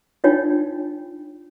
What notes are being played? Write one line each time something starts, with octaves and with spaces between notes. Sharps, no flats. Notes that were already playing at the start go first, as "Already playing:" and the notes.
D4 D#4 F4 C#5 G5